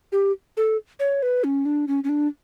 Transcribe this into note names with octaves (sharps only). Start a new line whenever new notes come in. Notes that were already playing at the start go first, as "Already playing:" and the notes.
G4
A4
C#5
B4
C#4
D4
C#4
C#4
D4